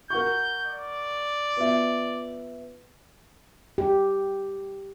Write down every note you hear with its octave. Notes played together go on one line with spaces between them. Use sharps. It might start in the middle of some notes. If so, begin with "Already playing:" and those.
A#4 F#5 C#6 G6
D5
B3 F4 E5
G4